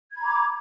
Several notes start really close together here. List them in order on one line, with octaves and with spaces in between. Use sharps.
G#6 B5 A#5 D6